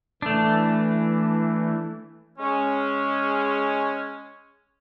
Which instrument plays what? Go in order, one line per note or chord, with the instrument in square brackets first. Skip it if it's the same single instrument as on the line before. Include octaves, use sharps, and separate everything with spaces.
[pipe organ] E3 [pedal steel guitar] A3 D4
[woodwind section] G#3 C#4